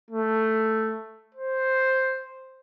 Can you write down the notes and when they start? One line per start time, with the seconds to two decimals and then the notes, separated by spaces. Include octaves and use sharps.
0.10 A3
1.34 C5